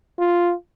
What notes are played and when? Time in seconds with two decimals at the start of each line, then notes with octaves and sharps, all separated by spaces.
0.19 F4